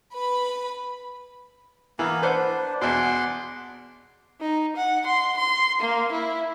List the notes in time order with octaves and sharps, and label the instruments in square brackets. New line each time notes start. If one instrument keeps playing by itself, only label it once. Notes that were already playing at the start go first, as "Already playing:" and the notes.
[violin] B4 B5
[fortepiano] E3 [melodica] A#3 B3 F5
[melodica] D4 [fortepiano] B4 C5 F#5
[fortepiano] E2 B2 [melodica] F#5 C6 D6
[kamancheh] D#4
F#5
C6
C6
A#3
E4